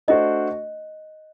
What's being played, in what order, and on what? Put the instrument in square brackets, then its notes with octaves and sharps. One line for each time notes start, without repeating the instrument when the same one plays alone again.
[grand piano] A3 D4 F#4 A4 C5 [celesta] D#5